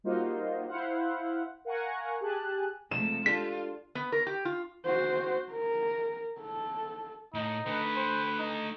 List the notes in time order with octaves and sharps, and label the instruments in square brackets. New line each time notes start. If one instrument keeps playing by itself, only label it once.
[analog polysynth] G3 A#3 D#4 F4 F#4 C5
E4 C5 F5 F#5
A#4 F5 F#5 G#5 A#5 C#6
G4 G#4 G#5 A5 F#6
[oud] C3 F3 [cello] G#3 A3 [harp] E7
[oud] D4 G4 A4 [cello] F4 [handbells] B6
[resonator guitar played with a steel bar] B3
A#4
G4
F4
[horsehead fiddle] F#4 C5
A#4
A4
[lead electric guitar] A2 [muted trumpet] D#4
[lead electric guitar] A3 D4 [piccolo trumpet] B4
[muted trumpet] C5
D#4